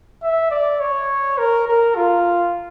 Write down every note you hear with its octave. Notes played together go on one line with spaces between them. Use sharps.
E5
D5
C#5
A#4
A#4
F4